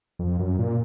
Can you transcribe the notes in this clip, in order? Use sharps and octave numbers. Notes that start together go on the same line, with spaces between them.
F2
F#2
A#2